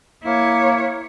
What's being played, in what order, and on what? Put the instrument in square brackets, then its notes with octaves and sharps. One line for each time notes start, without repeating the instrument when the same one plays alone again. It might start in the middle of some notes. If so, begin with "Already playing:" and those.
[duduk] A#3 [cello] E4 C#5